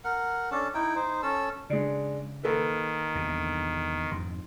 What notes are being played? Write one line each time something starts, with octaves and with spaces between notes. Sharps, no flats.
A#4 F#5
C#4 D4 A4 A5
D#4 E4 G5
D#4 C5
C#4 A4 E6
C#3 G#3 D4
D#3 A#3 A4 B4
E2 G2 C3
F2 G#2 C6